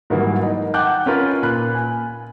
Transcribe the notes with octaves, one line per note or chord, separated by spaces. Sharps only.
G#2 D#3 E3 F#3 G3 A#3
D#4 D#5
F#5 G5 A5 D6 F#6 G6
C#4 D#4 F4 A#4 B4
A#2 B5 F#6
G#5